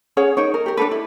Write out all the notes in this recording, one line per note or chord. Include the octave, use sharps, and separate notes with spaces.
C#4 G#4 C#5 F#5
D#4 A#4 C#5
A#4
G4 A#4
D4 D#4 A4 B4
E4